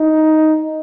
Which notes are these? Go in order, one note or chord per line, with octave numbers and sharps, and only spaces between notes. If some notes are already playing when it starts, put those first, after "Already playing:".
Already playing: D#4